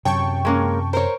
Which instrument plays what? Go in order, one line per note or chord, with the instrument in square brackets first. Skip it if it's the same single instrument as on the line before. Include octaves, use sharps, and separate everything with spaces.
[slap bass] F#2 C3 F#3 [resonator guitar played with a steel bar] C#5 [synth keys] G5 A5 C#6
[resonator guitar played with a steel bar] G#3 A#3 C#4
[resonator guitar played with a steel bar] A#4 C#5 [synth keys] C5